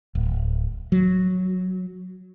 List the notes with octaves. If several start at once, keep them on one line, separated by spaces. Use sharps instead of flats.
D1
F#3